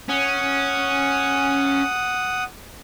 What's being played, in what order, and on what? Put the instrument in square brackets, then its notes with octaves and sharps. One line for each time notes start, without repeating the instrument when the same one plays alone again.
[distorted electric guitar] C#4 [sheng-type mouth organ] F#5 D#6